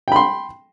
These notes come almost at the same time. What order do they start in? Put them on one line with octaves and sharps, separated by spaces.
G5 B5 C6